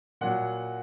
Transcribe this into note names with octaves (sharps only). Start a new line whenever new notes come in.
A#2 F#3 F#5